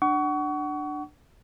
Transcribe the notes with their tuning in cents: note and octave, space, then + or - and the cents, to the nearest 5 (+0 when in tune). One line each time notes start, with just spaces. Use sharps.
D4 +15 F#5 +25 C#6 +30